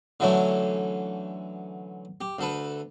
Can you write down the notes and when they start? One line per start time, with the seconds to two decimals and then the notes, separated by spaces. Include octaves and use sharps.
0.20 D3 E3 F#3 A3 C#4
2.21 G4
2.39 D2 A4 B4